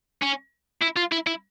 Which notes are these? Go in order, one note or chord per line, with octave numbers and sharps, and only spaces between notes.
C#4
E4
F4
E4
E4